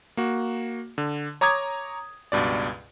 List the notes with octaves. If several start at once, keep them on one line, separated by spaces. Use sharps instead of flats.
A#3 F#4
D3
C#5 A#5 D6 D#6 G#6
C#2 G2 B2 D5